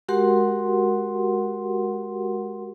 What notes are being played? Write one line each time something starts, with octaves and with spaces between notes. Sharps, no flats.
G#3 F#4 G4 A#4 F#5 C6